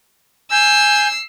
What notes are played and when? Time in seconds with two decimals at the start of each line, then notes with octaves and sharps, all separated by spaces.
0.52 G#5 E6 G6 C7